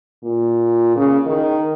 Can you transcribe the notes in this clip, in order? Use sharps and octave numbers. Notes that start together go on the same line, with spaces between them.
A#2
C#3
D#3